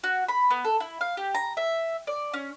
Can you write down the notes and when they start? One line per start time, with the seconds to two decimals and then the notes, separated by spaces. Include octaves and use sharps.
0.04 F#4
0.28 B5
0.50 B3
0.65 A4
0.80 E4
1.01 F5
1.17 G4
1.35 A#5
1.57 E5
2.07 D5
2.33 C#4